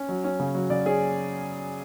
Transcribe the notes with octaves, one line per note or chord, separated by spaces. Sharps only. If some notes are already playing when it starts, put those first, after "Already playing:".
Already playing: C#4
F#3
C#4
C#3
F#3
C#3 D5
C#4 G#4